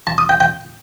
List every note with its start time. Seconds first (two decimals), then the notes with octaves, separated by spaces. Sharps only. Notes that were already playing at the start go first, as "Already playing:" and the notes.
0.07 A5
0.18 D#6
0.29 G5
0.40 G5